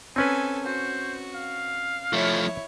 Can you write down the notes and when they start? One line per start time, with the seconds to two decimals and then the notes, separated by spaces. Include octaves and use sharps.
0.16 C4 C#4 A4 B4 G#5
0.65 F#4 C5
1.34 F5
2.13 F3 A3 E4 C#5